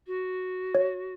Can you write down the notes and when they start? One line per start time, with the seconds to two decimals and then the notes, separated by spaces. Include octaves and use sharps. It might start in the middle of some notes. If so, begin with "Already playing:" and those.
0.06 F#4
0.75 C#5